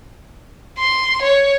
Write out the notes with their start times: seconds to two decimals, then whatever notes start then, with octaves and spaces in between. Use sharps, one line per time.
0.79 C6
1.22 C#5